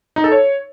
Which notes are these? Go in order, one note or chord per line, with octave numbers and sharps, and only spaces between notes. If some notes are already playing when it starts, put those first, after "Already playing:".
D#4
A4
C#5